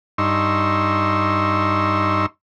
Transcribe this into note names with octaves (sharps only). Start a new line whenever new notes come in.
G2 D#4 C6 C#6 E6